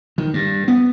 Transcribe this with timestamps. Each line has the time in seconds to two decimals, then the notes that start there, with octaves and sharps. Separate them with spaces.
0.18 D#3
0.34 G2
0.68 B3